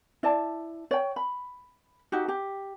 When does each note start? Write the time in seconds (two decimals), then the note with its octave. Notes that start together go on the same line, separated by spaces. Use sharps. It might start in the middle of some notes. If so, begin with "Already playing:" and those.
0.23 E4 D5 A5
0.91 C#5 G5
1.16 B5
2.12 D#4 F#4 G4
2.28 G4